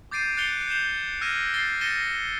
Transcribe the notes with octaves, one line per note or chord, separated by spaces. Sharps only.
D6 G6 A6 C7 D7 D#7
F#6 A6 C7 C#7 F7 G7
G6 C7 E7 F7
E6 F6 G#6 A#6 D#7 E7
A6 C7 G7
A6 A#6 C#7 D#7 E7 G7